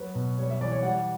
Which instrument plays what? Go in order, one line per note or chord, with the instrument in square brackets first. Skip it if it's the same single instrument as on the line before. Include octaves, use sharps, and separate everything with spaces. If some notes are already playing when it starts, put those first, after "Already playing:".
Already playing: [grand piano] F#3 B4
B2
G3 C#5
E5
E3 D5
C#5
G3 F#5